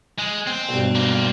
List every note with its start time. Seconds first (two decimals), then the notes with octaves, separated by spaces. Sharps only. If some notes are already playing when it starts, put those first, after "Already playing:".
0.18 G#3
0.47 C4
0.69 B1 G2
0.95 A#3 C4